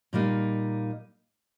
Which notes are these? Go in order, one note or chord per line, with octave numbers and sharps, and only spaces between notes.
A#2 G3 A#3 D#4